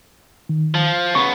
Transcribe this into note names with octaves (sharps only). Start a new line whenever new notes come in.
D#3
F3
C#3 B3 C#6